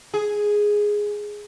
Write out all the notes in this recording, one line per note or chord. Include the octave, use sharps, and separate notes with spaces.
G#4